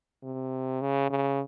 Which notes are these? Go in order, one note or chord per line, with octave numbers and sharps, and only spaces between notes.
C3
C#3
C#3